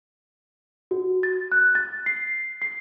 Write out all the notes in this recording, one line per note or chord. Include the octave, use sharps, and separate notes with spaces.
F#4
A6
F#6
A6
C7
C7